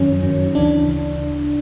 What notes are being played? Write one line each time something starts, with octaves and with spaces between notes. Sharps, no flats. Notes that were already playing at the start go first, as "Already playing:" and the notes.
Already playing: F#2 D#3 F#3 C#4
F#2 D#3 F#3
D2 C#3 E3 D4